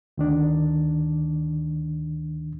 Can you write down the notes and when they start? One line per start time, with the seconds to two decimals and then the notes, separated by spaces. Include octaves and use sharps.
0.18 D2 D#3 D4